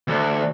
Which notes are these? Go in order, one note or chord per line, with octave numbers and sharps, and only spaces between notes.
D2